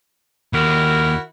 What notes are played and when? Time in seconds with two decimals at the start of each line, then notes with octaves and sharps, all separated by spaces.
0.53 D#2 E4 F#4 A#4